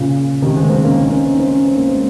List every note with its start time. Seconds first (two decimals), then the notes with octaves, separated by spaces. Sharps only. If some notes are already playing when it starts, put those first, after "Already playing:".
Already playing: A#2 C#3
0.42 C3 D#3
0.56 G#3 C4
0.63 A#3
0.70 G#3 C4
0.83 A#3 C#4
0.98 C4 D#4
1.11 A#3 C#4
1.26 C4 D#4
1.39 C4 D#4
1.53 C#4
1.65 C4
1.77 A#3
1.89 G#3 C4